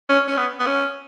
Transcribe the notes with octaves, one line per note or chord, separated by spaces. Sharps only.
C#4
C#4
B3
B3
C#4